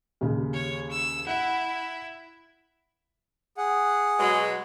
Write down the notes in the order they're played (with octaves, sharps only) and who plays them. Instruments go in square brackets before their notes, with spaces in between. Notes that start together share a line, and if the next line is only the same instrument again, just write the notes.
[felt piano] D#2 C#3
[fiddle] C#5
E6
[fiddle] E4 [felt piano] F#5
[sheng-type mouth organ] G#4 F#5
[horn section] B2 F#3 G#3